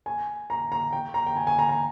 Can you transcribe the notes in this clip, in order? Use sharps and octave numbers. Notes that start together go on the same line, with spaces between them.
G#5
A#5
A#5
G5
A#5
G5
G#5
G#5
A#5
A#5